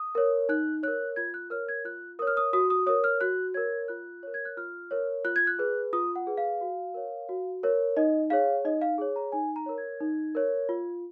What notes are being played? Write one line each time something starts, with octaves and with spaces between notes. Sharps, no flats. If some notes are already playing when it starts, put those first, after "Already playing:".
Already playing: D#6
A#4 C#5
D#4 F#6
A#4 C#5 F#6
F4 G#6
F#6
A#4 C#5 F6
G#6
F4 F#6
A#4 C#5 D#6
F6
D#6
F#4 D#6
D#6
A#4 C#5 D#6
F6
F#4 F#6
A#4 C#5 G#6
F4 F#6
A#4 C#5
G#6
F#6
F4 F6
A#4 C#5
F4 F#6
G#6
F#6
G#4 B4
F4 D#6
F#5
G#4 B4
F5
F#4
A#4 C#5
F#4
A#4 C#5
D#4 D#5
G#4 C#5 F5
D#4 D#5
F5
G#4 C#5
A#5
D#4 G#5
A#5
A#4 C#5
G#6
D#4
A#4 C#5
F4